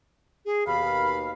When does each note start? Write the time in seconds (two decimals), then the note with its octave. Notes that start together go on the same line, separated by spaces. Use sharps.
0.46 G#4
0.67 D#2 B2 F5 B5